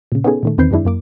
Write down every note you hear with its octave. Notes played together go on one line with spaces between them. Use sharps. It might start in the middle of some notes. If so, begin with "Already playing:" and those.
A#2 C#3
B3 C#4 D#4 G#4 A4
A#2 D#3 A3
E2 D#3 C4 B4 G6 C7
F#2 D#3 G#3 D4 E4
F#2 A#3 D6